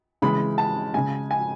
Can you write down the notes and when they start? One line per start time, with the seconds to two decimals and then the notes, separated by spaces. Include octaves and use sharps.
0.22 C#3 E3 G#3 B5
0.58 A5
0.94 C#3 G#3 G#5
1.31 G#5